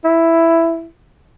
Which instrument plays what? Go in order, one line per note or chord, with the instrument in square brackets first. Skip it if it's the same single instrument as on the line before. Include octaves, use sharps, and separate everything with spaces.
[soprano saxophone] E4